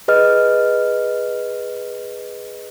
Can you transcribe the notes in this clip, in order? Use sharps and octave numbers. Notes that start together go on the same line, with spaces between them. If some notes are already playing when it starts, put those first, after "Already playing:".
G#4 B4 D#5 F6